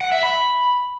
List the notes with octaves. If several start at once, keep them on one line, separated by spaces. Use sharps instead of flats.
F#5
E5
B5